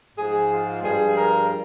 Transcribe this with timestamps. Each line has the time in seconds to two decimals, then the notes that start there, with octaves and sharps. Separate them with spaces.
0.18 G#2 F3 G#4
0.50 F4
0.83 G2 F3 G#4
1.16 A#4